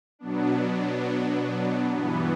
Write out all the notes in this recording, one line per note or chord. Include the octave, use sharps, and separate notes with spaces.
B2 F#3 B3 D4
G2 E3 B3